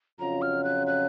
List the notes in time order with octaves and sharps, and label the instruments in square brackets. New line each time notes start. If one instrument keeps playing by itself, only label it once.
[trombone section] F2 C#3 F#3 C#4 F4 [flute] A#5
[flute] F6
F#6
F#6